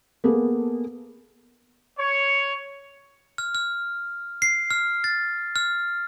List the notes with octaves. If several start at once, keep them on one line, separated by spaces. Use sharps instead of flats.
A#3 B3 G#4 A4
C#5
F6
F6
C7
F6
A6
F6